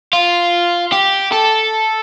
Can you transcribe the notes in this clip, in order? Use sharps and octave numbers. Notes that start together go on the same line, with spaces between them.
F4
G4
A4